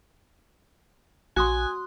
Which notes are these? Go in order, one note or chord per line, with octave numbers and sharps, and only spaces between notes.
A#1 F#4 G#5 C6 D#6 F#6